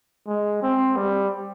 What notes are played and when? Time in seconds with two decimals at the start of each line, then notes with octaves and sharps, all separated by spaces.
0.26 G#3
0.62 C4
0.96 G3